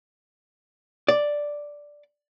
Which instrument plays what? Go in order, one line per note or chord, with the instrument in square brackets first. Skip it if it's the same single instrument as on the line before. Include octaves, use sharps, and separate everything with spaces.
[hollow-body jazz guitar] D5